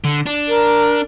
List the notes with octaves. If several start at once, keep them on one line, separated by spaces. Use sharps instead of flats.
D3
D4
A#4